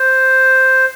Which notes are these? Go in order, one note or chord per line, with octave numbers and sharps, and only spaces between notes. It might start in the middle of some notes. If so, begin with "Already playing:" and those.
Already playing: C5